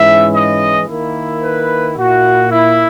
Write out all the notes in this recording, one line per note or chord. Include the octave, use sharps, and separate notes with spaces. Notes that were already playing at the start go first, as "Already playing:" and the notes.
Already playing: G#2 E3 G#3 C#4 E4 E5
D#5
D#3 A#3 E4
B4
A#2 A#3 E4 F#4
E4